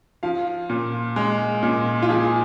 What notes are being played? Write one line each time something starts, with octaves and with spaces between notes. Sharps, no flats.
F3 F5
A#2
G#3
A#2
F4
F3 G#4